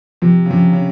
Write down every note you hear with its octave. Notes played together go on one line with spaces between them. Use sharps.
C3 F3
C#3
C3 F3
C#3